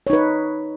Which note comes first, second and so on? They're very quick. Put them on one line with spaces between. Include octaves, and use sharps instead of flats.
C#5 D#4 B4